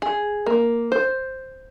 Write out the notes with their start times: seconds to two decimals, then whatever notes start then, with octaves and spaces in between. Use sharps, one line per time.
0.02 G#4
0.46 A#3
0.92 C5